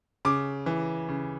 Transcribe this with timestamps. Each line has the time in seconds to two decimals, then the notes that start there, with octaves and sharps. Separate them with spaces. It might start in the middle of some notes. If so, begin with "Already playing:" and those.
0.25 C#3 D6
0.66 E3
1.09 C#3